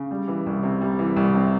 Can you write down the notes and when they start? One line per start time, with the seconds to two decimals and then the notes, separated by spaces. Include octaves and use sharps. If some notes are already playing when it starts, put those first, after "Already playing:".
Already playing: C#3
0.11 G3
0.28 E3
0.46 C2
0.63 C3
0.81 G3
0.99 E3
1.16 C2
1.35 C3